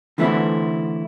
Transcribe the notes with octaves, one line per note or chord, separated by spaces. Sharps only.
D3 E3 A3 B3 C4 E4